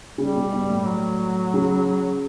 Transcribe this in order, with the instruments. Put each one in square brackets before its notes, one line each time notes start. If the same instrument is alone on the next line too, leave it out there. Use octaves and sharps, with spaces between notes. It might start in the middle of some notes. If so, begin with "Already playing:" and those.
[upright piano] C#3 [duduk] G3
[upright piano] B2
G2
A2
[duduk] F#3
[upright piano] C#3